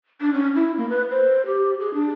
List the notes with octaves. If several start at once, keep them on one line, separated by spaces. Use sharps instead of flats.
D4
C#4
E4
A#3
B4
C5
G4
G#4
D4